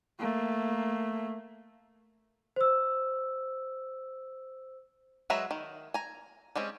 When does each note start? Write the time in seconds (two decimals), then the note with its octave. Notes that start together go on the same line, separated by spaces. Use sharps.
0.20 A3 A#3
2.56 C5 E6
5.30 F#3 G#3 B4 E5 A#5
5.51 D#3
5.94 G#5 A#5
6.56 G3 G#3 C4 C#4